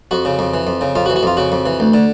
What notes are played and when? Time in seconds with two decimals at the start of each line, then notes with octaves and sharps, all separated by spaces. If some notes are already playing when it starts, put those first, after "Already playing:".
0.11 F2 F#4
0.25 C#3
0.39 F2
0.54 E3
0.67 F2
0.81 C#3
0.95 F2 F4
1.06 F#4
1.10 E3
1.16 F#4
1.23 F2 F4
1.37 C#3 F#4
1.52 F2
1.66 E3
1.80 D2
1.94 D3